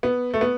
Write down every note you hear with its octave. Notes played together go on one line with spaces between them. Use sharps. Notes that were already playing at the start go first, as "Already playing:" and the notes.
B3
A3
B3